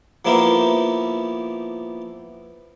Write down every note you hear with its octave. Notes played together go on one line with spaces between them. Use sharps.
F3 A#3 B3 E4 G4 A#4